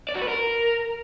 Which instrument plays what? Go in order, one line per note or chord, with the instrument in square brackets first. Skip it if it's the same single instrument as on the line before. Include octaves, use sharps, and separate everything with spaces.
[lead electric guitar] D5
F#4
B4
A#4